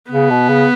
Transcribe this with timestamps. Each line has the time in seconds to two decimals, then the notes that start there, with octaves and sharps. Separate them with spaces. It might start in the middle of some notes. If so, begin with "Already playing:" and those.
0.11 C#3 B3
0.30 B2
0.49 C#3